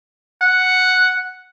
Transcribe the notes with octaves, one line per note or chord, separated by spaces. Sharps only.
F#5